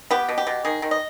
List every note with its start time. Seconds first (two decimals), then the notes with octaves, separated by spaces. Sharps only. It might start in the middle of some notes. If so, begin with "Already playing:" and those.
0.11 B3 G4
0.29 B2
0.38 G4
0.47 B2
0.65 D#3 G#4
0.82 D#3
0.91 D#5